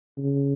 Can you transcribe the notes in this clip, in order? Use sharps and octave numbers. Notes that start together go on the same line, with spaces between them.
C#3